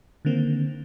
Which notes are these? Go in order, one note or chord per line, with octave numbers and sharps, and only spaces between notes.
D3 D#3 A#3 C4